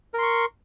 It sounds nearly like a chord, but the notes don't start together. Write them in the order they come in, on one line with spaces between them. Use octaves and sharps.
A#4 C6 C#6